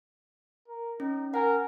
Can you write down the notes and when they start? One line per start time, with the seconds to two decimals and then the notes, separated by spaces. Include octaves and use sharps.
0.68 A#4
1.00 C#4 D#4
1.34 A#4 F#5 G#5